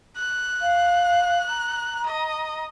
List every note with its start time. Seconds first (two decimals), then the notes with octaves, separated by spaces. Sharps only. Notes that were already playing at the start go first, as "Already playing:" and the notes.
0.17 F#6
0.61 F5
1.49 A#5
2.06 D#5